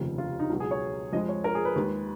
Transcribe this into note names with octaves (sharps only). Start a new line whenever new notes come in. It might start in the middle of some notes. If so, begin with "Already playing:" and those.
Already playing: F1 D#2 C#3 F3
F4
D#4
C#2 B2 F#3
G#4
C#5
F2 F3 G#3 D#5
C#5
A#4
G#4
B4
D#2 D#3 G#3